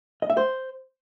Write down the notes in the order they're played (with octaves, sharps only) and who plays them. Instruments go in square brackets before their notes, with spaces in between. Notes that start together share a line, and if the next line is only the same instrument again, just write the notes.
[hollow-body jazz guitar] D#5
E5
C5